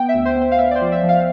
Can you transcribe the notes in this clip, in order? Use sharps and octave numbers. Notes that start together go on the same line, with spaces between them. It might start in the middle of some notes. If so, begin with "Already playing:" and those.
Already playing: B3 G5
E5
D2
C5
B3
C5
F5
B3 E5
D5
C5
F3
E5
F3
F5